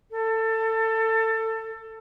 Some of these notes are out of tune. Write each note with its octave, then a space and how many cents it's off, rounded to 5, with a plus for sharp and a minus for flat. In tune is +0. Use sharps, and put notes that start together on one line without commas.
A4 +20